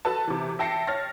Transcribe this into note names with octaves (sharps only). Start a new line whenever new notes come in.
F#4 A4 B4 A5
C3 E3
E5 G5 A5 A#6 C7 C#7
C#5 F6 A6 A#6